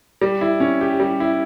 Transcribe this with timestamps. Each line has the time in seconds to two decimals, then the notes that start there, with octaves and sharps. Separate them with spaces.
0.21 G3
0.41 E4
0.60 C#4
0.81 G4
1.00 G3
1.20 E4